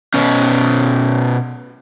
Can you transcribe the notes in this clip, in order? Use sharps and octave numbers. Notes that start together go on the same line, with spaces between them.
B2 C#4